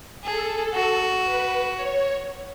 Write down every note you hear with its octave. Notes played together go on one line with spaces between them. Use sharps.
G#4 A4
F#4
B4
C#5